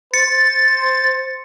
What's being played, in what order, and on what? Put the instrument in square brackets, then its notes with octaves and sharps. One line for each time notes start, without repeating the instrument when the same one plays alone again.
[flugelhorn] C5 [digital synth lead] A6 [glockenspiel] C#7